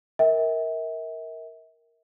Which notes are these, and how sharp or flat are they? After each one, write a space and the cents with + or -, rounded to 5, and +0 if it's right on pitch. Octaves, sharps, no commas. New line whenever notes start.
A#4 +0 E5 -40 G5 +0